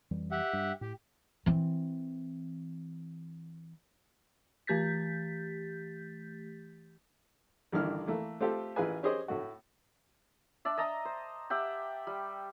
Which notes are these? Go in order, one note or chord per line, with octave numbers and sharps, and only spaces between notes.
F2 E3 G3
G4 E5 F#5
G2
A2 G4
E3 C4
E3 A3 G4 G6 A6 B6
A1 G2 D3 D#3 E4 F6
E3 A3 A#3
A3 C4 F4 G4 A4
A1 E4 F4 G#4 B4 G#5
C#4 G4 G#4 C5 D#5
A2 A3 F#4
D4 D5 E5
D#5 A5 A#5 D#6
C5
G4 E5 F#5 G5
G3